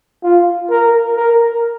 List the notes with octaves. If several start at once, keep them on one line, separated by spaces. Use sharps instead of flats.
F4
A#4
A#4